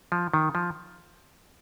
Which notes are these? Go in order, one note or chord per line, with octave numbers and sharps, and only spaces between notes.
F3
D#3
F3